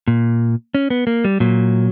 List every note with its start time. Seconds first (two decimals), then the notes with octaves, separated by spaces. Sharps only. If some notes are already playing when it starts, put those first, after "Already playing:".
0.08 A#2
0.75 C#4
0.90 B3
1.07 A#3
1.25 G3
1.40 A#2 F#3